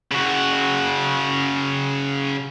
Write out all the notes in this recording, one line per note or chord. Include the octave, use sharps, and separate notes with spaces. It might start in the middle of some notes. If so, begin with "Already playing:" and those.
C#3 F#4